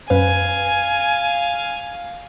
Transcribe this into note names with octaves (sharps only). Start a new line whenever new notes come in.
F#2 B4 F5 G#5